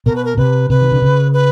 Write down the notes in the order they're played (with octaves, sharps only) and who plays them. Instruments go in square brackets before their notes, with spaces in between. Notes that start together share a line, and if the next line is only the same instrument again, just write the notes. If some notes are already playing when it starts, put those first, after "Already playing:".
[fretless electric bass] B2 [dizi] A#4
[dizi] B4
A#4
[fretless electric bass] C3 [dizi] B4
[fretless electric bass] C3 [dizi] B4
[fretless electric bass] D#3
D3
C#3
[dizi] B4